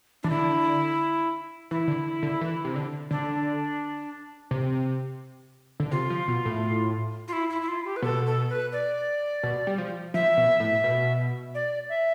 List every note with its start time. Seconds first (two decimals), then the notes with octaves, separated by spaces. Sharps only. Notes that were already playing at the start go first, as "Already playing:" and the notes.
0.23 E3 D4
0.30 D3 E4
1.71 E3 E4
1.88 D3
2.23 D3
2.41 E3
2.65 C3
2.76 D3
3.11 D3 D4
4.51 C3
5.80 D3
5.91 C3 F4
6.10 F3
6.28 B2
6.45 A2
7.28 F4
7.33 E4
7.50 E4
7.62 E4
7.68 F4
7.85 G4
7.96 B4
8.02 B2 A4
8.26 A4
8.49 B4
8.72 D5
9.43 B2
9.67 G3
9.78 F3
10.14 F3 E5
10.37 B2
10.60 A2
10.84 B2
11.54 D5
11.89 E5